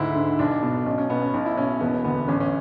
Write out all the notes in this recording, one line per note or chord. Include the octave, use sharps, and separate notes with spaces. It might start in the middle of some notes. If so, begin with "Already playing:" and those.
Already playing: D2 G#2 E4
D3
B1 D4
B2
B1 C#4
C#4
B2 B3
C#4
B1
E4
B2 C#4
E1 B3
D2 B3
A1 C#4
C#4